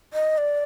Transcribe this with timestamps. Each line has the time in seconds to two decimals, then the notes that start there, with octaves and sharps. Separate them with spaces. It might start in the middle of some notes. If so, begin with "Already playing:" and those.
0.13 D#5
0.38 D5